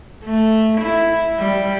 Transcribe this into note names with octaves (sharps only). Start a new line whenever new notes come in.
A3
E4
G3